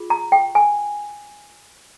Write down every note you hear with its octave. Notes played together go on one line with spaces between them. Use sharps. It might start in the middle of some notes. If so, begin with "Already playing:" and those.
Already playing: F4 G#4
A#5
G5
G#5